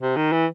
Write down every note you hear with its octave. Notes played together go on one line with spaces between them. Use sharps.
C3
D#3
E3